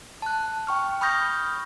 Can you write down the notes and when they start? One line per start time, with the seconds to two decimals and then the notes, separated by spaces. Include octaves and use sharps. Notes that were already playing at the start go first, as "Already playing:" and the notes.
0.22 A5 F#6
0.67 G5 C#6 F6
1.01 B5 C#6 D#6 F6 G6 A#6